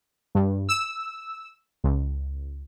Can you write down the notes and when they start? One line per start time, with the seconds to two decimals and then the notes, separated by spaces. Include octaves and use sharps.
0.35 G2
0.69 E6
1.84 C#2